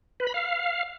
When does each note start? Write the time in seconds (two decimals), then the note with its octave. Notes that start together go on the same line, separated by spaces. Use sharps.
0.20 B4
0.27 B5
0.34 F5